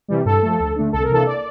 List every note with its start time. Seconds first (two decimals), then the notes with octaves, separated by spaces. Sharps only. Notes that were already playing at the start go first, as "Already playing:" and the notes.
0.08 C3 E3 G3
0.25 G2 A4
0.43 F3 A3
0.60 D2
0.76 D3 A3 D4
0.93 C2 A4
1.03 A#4
1.09 C3 E3 A#3 D4 A4
1.26 D5